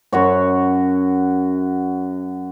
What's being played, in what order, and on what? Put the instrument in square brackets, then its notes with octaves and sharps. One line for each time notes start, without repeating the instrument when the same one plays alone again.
[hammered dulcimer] F#2 F#4 C#5